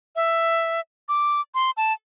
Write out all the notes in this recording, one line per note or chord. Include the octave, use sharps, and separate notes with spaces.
E5
D6
C6
A5